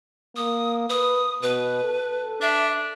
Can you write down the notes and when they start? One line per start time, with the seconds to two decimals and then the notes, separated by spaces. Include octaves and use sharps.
0.36 A#3 D#6
0.90 B4 D#6
1.42 B2 B4
1.84 A4
2.42 D4 E5